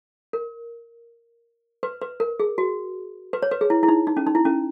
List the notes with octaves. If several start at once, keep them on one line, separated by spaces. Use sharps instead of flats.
A#4
B4
B4
A#4
G#4
F#4
B4
C#5
B4
G#4
E4
E4
D#4
D#4
C#4
D#4
E4
C#4